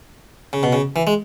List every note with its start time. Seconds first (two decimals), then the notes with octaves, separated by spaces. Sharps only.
0.53 C#3
0.63 B2
0.73 C#3
0.96 E3
1.07 G#3